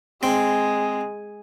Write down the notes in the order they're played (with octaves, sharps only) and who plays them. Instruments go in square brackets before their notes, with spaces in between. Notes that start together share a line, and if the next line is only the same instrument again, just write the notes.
[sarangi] G#3 [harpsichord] C4